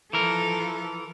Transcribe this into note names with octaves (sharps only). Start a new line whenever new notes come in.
E3 F3 A4 A#4